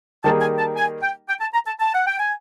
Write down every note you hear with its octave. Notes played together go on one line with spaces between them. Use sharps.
D#3 G3 A#3 D#4 G#4 A5
G#5
A5
G#5
G5
G5
A5
A#5
A5
A5
F#5
G5
G#5